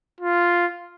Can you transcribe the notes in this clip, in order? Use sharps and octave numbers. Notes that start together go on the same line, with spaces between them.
F4